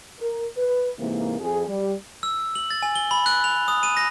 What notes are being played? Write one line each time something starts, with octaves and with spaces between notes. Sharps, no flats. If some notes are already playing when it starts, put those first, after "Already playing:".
A#4
B4
G#2 C3 E3 A#3
F2 G#4
G3
E6
F#7
A6
G#5
G7
B5
F#6
F7
D#6
D#7
A#6